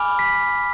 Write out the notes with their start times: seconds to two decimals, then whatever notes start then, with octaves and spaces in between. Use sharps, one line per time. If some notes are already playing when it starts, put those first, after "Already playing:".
Already playing: G#5 B5 D6 F6
0.19 B6